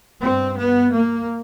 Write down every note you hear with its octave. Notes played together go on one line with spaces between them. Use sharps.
G2 C4
B3
A#3